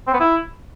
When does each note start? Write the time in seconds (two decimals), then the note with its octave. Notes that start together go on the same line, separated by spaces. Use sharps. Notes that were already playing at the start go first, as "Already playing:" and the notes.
0.07 C4
0.14 B3
0.20 E4